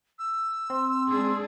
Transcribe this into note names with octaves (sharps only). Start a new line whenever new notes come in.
E6
C4 C6
G#3 D4 G#4